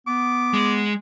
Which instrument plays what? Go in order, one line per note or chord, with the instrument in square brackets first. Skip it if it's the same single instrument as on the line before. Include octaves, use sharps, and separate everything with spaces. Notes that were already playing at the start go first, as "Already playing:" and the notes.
[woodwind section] B3 [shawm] D6
[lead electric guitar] G#3